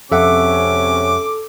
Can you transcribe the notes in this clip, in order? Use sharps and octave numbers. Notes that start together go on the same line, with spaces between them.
F2 G#2 C3 C#4 A4 E5 F#5 D6